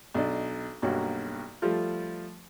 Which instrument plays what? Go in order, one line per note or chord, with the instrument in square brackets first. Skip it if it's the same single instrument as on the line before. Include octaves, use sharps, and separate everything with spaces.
[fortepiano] B1 D4 D#5
B1 G2 A#3 F#4 C#5
F3 G3 A3 F4